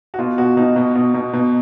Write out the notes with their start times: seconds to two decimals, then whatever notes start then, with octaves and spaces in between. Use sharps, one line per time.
0.14 F#4
0.18 B2 F4
0.38 B2 F#4
0.57 B2 D#4
0.76 B2
0.95 B2
1.14 B2
1.33 B2